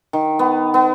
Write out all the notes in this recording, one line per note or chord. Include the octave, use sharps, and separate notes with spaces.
D#3
B3
B3